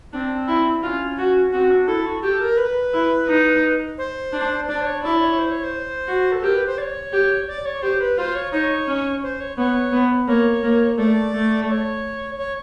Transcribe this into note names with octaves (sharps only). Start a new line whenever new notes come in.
C4 D4
E4
C#4 D4 F4
F#4
C4 F#4
D4
E4 A4
F#4
G4 A4
A#4
B4
E4
D#4
C5
D4
D4 D5
C5
C#5
E4 D5
C#5
C5
C#5
C5
F#4
A4
G4 A#4
B4
C5
D5
C#5
G4
D5
C#5
G4 C5
B4
F4 C5
C#5
D#4 C#5
C#4
C5
C#5
B3 C#5
B3
A#3 C#5
A#3
A3 D5
A3
D5
C#5
C#5